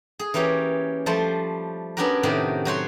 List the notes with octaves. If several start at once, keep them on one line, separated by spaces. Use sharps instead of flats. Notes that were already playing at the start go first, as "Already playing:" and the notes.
G#4
E3 A#3 C#4 G4 C#5
F3 G3 A3 C5
B3 C#4 D4 F#4 G4 A#4
A2 C3 D#3 A#3 F#4 G4
F#3 F#4 C5 C#5